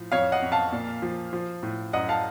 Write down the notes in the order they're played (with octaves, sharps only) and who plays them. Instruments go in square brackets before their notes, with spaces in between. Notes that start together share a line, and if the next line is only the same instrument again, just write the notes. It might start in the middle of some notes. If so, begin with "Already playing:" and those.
Already playing: [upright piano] A2 F3
F2 C#5 F5
D#5 F#5
F2
F5 A5
A#2
F3
F3
A2
F#2 D#5 F#5
F5 A5